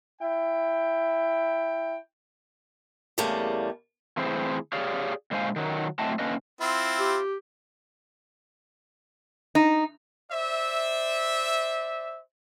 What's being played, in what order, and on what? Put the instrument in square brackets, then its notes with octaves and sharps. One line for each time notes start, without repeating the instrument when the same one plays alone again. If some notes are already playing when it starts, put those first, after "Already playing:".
[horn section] E4 G5
[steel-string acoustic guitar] E2 C#3 G3 A3 A#3
[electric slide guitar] E3 A3 C4 E4 G#4 C5
G4 G#4 C#5 D5 F5
A#2 D3 G#3 C5 F5 G#5
D#3 F#3
A2 F#3 A3 C4 D#5 A5
D3 A#3 C#4 B4 D#5
[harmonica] C4 E4 [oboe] F4
[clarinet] G4
[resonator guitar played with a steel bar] D#4
[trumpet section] C5 D5 E5